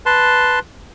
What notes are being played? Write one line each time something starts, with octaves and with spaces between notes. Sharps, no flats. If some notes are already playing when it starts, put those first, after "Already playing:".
B4 A5 C6